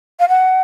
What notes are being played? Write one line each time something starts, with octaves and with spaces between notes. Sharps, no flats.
F5
F#5